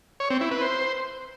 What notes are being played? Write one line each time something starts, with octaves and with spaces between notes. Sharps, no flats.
C#5
C4
E4
B4
C5